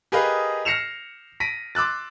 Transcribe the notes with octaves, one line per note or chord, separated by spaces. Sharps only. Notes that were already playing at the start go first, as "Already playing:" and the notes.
G4 G#4 A#4 B4 D#5 F5
F6 A#6 C7 C#7 E7 F7
A#6 B6 D7 D#7
C6 D6 E6 F#6 A6